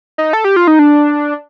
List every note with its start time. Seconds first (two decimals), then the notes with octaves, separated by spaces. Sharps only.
0.18 D#4
0.33 A4
0.44 G4
0.56 F4
0.67 D#4
0.79 D4